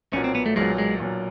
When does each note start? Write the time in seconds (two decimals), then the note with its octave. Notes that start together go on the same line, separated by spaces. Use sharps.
0.13 B1 A#2 F#3 C#4
0.24 C4
0.35 B3
0.46 A3
0.56 B1 A#2 F#3 G#3
0.78 G#3
1.00 B1 A#2 F#3